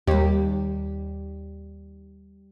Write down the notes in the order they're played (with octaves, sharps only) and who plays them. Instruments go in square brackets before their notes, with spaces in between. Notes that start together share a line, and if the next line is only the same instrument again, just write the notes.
[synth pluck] D#2 [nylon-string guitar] G3 G4